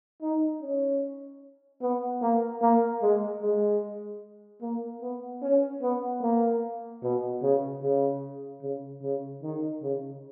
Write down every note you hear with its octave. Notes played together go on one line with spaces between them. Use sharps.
D#4
C#4
B3
A#3
A#3
G#3
G#3
A#3
B3
C#4
B3
A#3
B2
C#3
C#3
C#3
C#3
D#3
C#3